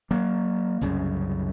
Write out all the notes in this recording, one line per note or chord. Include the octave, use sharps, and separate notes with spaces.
F#3 A#3
C2 F#2 C#3